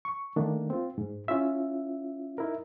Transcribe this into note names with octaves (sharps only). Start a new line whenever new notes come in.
C#6
D#3 A3 A#3 D4
C4 F4
G#2
C#4 E4 F4 E5
D#4 E4 A#4